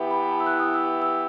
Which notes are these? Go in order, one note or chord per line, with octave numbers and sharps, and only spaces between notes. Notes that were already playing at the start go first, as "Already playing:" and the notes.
Already playing: E3 B3 E4 G4
B5
A5
E6
F#6
D#6
E6
E6